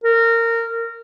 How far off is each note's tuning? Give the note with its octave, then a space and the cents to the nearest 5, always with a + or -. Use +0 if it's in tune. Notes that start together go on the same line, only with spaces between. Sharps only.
A#4 -20